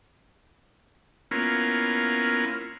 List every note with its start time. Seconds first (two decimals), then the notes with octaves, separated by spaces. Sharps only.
1.31 A#3 B3 C#4 E4 F4 A#4